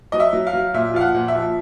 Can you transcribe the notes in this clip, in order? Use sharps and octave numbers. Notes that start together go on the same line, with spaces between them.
F#3 D#5
E5
F#3
F5
F#3
A#2 E5
F3 F5
F#5
A#2
E5
F3